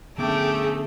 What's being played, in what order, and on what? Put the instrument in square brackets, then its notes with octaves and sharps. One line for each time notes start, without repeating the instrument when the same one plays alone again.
[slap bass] D3 B3 C#4 [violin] A3 [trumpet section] G4 G5 D6 [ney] G#4